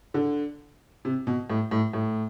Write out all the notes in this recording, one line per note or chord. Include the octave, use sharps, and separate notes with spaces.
D3
C3
B2
A2
A2
A2